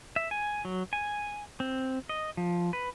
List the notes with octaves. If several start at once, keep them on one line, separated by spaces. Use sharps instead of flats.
E5
G#5
F#3
G#5
C4
D#5
F3
B4